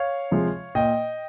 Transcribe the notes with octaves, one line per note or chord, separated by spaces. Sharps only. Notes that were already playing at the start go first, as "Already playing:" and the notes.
Already playing: C#5 F5
C3 F3 G#3
A#2 D#5 G5